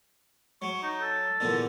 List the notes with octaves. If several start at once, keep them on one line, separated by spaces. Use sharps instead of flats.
F#3 C#6
D#4
A4
E2 A#2 D3